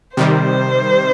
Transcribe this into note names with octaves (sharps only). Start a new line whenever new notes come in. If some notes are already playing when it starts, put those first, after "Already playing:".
C3 D#3 G3 C5